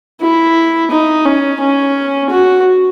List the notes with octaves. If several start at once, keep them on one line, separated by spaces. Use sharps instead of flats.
E4
D#4
C#4
C#4
F#4